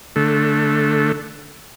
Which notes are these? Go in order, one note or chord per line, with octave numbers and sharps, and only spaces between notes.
D3 A3